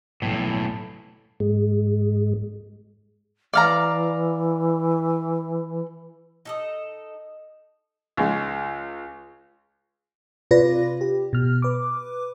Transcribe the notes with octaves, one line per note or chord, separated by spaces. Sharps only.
B1 A2
G#2 G#3
E3 D5 F5 A#5
D#4 A4 D#5
C#2 G#3
C3 F4 B4 D5 A#6
G4
B2 F6
B4 D6